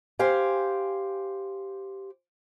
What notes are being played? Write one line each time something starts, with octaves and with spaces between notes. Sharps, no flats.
G4 C5 F5 G#5